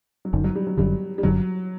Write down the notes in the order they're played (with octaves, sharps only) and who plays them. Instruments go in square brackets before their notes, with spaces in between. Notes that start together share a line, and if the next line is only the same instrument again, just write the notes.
[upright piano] F#3
[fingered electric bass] F#1 F#2 D3 [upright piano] D#3
[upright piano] F#3
G3
F#3
[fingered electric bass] F#1 F#2 D3 [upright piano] G3
[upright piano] G3
[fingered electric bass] F#1 F#2 D3 [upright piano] F#3